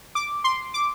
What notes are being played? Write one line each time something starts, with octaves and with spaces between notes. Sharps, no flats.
D6
C6
D6